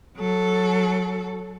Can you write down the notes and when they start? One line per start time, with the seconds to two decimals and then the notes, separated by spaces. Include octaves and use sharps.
0.17 F#3 A4